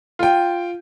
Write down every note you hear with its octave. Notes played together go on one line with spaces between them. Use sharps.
F4 G5